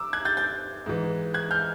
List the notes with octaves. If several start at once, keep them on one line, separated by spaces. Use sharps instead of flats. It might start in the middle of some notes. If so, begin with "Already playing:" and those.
Already playing: A#5 D6 E6
F#6 G#6
G6 A6
G6 A6
G#2 E3
F#6 G#6
F6 G6